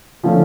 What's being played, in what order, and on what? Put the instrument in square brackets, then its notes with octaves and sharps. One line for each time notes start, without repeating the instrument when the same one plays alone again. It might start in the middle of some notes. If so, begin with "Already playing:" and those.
[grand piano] D3 F3 A3 C#4